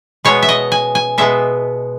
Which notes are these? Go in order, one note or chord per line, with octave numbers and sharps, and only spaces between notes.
B2 G#3 B3 C#5
E5
D#5
G#5
G#5
B2 G#3 B3 E5